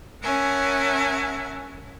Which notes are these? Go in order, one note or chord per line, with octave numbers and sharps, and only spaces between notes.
C#4 A#4 E5 F#5 G#5 A5